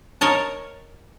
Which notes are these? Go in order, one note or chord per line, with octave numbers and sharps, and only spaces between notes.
A#4 C#5 D#5 A5